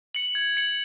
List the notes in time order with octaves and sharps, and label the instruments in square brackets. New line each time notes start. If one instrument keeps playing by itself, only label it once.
[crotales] C#7 F#7
G#6
C#7 F#7